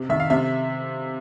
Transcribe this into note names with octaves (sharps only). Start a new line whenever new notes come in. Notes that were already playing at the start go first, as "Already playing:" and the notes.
Already playing: C3
D#3 E5
F5
C3 E5